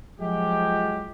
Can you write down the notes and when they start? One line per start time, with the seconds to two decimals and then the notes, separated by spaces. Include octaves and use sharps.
0.20 F3 F#3 G#3 G4